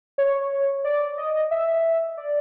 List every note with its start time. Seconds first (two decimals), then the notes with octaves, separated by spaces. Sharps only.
0.18 C#5
0.84 D5
1.18 D#5
1.51 E5
2.17 D5